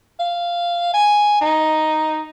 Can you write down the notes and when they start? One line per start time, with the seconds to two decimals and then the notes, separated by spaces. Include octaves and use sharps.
0.19 F5
0.94 G#5
1.41 D#4